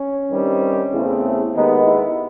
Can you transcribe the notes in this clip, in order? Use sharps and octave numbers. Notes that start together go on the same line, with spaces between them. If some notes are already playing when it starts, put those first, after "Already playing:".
Already playing: C#4
G2 D#3 G3 C4
E2 C#3 E3 A3 C4
D#2 D#3 G#3 B3 D#4
E4